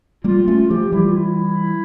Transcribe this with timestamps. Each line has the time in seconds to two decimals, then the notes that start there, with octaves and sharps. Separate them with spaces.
0.24 G3 A#3 F4
0.48 A3 C#4 F4
0.70 F3 A3 G4
0.92 E3 G3 E4
1.05 F4
1.16 E4